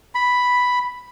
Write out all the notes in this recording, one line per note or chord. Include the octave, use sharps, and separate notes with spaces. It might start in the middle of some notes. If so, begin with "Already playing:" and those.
B5